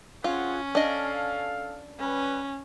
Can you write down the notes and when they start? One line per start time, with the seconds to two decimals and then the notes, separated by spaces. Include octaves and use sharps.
0.24 C4 C#4 F4 G#4 F#5
0.75 D4 A4 D#5 F5
2.00 G3 C#4 B4